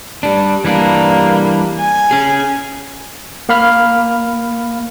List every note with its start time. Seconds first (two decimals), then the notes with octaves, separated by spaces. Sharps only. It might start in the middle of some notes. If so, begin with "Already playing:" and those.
0.23 G3 D4
0.64 E3 G3 A#3 D4
1.80 G#5
2.11 C#4 G#4
3.49 A#3 F5 B5 F6